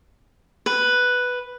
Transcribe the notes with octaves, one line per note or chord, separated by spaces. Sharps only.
B4